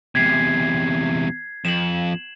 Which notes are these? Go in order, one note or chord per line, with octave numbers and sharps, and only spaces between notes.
E2 C3 G#6 B6 C7
F2 E7 F#7